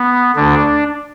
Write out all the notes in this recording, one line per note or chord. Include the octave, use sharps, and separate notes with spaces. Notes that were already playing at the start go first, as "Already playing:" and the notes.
Already playing: B3
D2 D3 D4